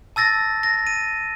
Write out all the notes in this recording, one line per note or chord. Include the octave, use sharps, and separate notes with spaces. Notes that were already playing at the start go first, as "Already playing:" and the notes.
A5 E6 A6 A#6
A#6
D#7